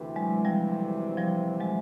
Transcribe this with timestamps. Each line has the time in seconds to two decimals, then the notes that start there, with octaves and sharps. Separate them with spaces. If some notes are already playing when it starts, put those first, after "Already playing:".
Already playing: D2 C3 E3
0.16 F#3 G#3
0.45 F3 G3
1.17 F3 G3
1.60 F#3 G#3